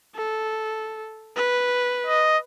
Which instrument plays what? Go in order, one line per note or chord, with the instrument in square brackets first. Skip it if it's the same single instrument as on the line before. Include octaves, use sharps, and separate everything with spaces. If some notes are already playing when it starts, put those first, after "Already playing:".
[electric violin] A4
B4
[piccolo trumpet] D#5